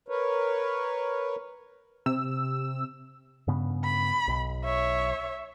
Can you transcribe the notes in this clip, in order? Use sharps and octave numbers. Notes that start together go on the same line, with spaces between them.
A#4 B4 C#5
C3 E6
G2 C#3 B3
B5
B1
C#5 E5